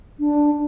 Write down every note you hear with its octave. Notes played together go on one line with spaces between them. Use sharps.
D4